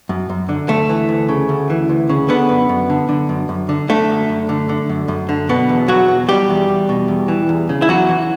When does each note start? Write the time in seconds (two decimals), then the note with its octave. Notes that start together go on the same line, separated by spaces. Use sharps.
0.09 F#2
0.30 F#2
0.49 D3
0.69 D2 A3
0.89 E3
1.09 D2
1.29 C#3
1.49 D2
1.70 E3
1.89 D2
2.09 C#3
2.29 D3 B3
2.49 F#2
2.69 F#2
2.90 D3
3.09 D3
3.29 F#2
3.49 F#2
3.69 D3
3.89 D3 A3
4.10 F#2
4.29 F#2
4.49 D3
4.69 D3
4.89 F#2
5.08 F#2
5.29 D3
5.49 B2 B3
5.69 E2
5.88 E2 F#3 F#4
6.08 B2
6.28 B2 G3 G4
6.49 E2
6.68 E2
6.89 B2
7.08 E2
7.28 E3
7.49 E2
7.69 C#3
7.82 E4
7.89 E2 F#3 F#4
8.09 E3